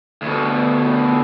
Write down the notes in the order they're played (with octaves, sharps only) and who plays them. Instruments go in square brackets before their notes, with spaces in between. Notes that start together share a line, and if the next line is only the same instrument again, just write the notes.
[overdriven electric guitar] D2 B2